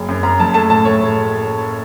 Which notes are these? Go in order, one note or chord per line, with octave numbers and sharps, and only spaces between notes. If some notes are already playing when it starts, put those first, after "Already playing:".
Already playing: F#1
F#2
F#2 A#5
F#1 A5
A3 A5
A2 A5
A3 C#5
A2